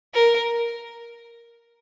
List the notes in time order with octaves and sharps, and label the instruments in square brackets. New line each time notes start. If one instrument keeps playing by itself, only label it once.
[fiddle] A#4